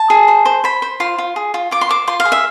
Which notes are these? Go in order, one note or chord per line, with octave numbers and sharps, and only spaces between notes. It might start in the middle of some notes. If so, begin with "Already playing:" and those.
Already playing: A5
G#4
C5
C5
C5 B5
C5
F4 C6
F4
G#4
F4
F4 D6
C6
C5 D6
F4 C6
F5
G#4
E5